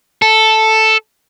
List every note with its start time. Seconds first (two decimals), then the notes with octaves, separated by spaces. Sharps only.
0.22 A4